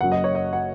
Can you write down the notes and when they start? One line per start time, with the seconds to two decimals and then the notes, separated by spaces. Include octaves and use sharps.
0.01 F#1 F#2 F#3 F#5
0.12 D#5
0.24 C#5
0.35 D#5
0.53 F#5